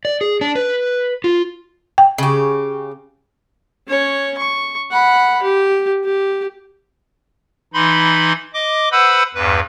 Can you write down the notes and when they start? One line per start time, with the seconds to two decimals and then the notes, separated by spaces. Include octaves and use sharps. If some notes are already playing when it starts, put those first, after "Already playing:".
0.05 D5
0.21 G#4
0.41 D4
0.55 B4
1.24 F4
1.98 G5
2.18 C#3 G4
3.88 C#4 C#5
4.37 C#6
4.91 F#5 B5
5.42 G4
6.04 G4
7.74 E3 D#4 B5 C6
8.54 D#5 D6
8.92 B4 C5 F#5 B5 E6
9.35 E2 G2 B4